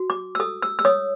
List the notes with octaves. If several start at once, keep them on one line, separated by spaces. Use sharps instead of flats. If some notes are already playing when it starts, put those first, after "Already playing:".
Already playing: F#4
D6
E6
A4 D#6
E6
E6
C#5 D#6